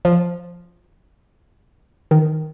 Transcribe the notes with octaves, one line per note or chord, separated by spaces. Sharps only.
F3
D#3